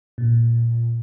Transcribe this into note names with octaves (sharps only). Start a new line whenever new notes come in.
A#2